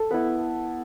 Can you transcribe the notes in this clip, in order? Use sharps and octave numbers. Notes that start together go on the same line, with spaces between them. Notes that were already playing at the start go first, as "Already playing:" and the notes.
Already playing: A4
B3 E4 B4